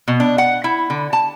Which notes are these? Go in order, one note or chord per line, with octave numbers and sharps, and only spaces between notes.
B2
D4
F#5
E4
D3
A5